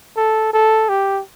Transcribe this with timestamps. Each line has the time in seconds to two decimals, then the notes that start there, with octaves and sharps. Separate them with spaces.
0.17 A4
0.53 A4
0.89 G4